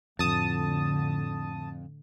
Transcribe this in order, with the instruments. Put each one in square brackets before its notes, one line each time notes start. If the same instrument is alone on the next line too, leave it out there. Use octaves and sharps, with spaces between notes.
[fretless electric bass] F2 [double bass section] A2 D3 [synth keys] A5 D#6